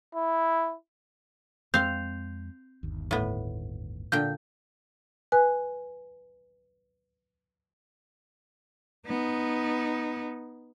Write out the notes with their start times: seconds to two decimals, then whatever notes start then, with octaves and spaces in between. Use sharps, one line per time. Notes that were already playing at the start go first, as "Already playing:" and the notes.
0.15 E4
1.74 F2 G#3 C4 F5 G6 C7 F7
2.83 G1 D#2
3.11 A2 B3
4.12 A#2 D3 G5 G6
5.32 B4 G#5 F#6
9.06 B3 D#4